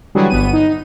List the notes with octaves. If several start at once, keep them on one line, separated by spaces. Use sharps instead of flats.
D3 E3 F#3 G3 F#4 G#4
G1 B3 D#7
D#4